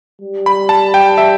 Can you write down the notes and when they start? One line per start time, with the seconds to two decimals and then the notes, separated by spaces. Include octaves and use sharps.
0.22 G3
0.46 B5
0.69 A5
0.94 G5
1.18 E5